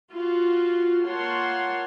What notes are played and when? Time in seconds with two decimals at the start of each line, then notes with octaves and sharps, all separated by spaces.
0.13 F4 F#4
1.04 A#3 F4 C#5 F#5 A5 C6